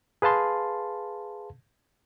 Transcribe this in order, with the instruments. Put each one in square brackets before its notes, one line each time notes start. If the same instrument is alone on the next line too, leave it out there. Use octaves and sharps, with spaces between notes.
[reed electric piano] G#4 B4 F5 A5 C6